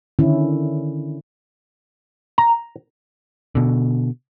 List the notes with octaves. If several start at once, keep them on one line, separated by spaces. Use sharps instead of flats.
D3 D#3 C#4 E4
A#5
B2 D3